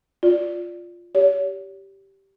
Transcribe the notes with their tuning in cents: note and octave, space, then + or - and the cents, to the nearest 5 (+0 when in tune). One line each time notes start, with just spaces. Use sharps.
F4 +0 D5 +0
G4 -10 C#5 +40